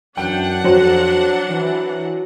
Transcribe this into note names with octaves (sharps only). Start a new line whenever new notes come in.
F#2 E3 D4 F#5 G5
F2 F#3 C5
E3